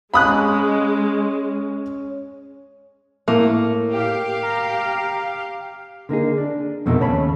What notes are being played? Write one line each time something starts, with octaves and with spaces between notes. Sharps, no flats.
G#3 C#4 B5 D#6 F#6
A2 A3 A#3
G4 F5
A#5
D3 A#3 D#4 G#4
D4
F2 B2 A3 B3 D#4 A#4
D#2 C#3 C#5 A5 B5